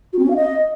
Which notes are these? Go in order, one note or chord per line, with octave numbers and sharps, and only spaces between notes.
F#4
C4
C#4
F5
D#5